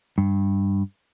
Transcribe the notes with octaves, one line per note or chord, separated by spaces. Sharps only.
G2